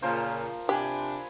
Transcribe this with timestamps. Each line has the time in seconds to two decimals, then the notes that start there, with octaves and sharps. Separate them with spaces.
0.02 A#2 C#3 F3 A#4 C5
0.69 C3 D4 G4 G#5 B5